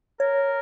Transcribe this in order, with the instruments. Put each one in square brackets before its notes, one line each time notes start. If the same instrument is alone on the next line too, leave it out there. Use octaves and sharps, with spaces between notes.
[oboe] A#4 [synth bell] C#5